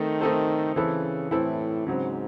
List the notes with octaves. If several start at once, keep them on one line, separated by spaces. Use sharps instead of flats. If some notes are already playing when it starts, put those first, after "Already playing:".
Already playing: D#3 A3 C4 D#4 A4 C5
A3 C4 D#4 A4 C5
C#3 E3 C4 E4 A4
A2 E3 C4 E4 A4
G#2 C#3 F#3 C4